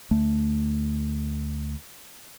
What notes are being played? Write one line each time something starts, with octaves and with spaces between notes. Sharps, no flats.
D2 A3